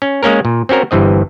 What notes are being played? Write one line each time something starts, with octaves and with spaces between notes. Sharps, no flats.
C#4
G#3 A#3 C#4 A#4
A#2
C4 C#4 F#4 A#4
G1 G2 E3 C4 D#5